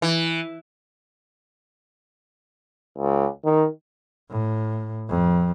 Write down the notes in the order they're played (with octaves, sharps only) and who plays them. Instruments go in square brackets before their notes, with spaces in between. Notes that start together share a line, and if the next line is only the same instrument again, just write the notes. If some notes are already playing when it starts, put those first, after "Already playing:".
[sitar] E3
[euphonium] C#2
D#3
[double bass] A2
F2